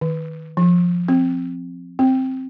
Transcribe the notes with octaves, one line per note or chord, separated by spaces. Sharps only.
D#3
F3
C4
C4